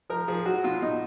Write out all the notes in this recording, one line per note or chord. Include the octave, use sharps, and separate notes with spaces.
F3 A#4
F3 G#4
F#3 F#4
B2 F4
B2 D#4